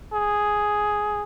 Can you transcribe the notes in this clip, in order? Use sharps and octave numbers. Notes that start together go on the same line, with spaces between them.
G#4